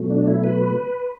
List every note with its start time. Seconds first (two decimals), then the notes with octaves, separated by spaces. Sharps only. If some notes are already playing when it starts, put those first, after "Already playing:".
Already playing: B2 F#3 A3
0.10 D4
0.27 E4
0.44 B4